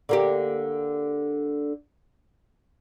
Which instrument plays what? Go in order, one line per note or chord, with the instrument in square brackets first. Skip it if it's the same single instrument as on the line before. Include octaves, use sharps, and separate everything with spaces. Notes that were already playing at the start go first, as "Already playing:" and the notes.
[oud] D3 A#3 G4